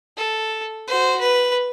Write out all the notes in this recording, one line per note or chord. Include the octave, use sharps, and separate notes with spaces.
A4
F#4 C5
B4